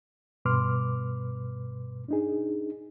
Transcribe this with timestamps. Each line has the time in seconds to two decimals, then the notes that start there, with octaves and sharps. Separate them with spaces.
0.45 G2 B2 B4 C6 D6 F6
2.08 D4 D#4 G#4